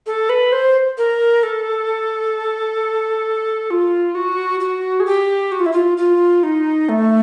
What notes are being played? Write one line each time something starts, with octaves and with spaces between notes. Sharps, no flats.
A4
B4
C5
A#4
A4
F4
F#4
F#4
G#4
G4
F#4
F4
E4
F4
F4
D#4
A3